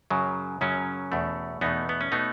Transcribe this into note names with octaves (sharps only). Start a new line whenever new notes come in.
F#2 C#3 F#3
F#2 C#3 F#3 C#4
E2 B2 A3
E2 B2 A3 B3 D#4
B3
C#4
B2 A3 B3 D#4